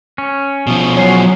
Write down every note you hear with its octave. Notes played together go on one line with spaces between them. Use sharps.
C#4
B2 F3
F#3 C#5 G#5 C7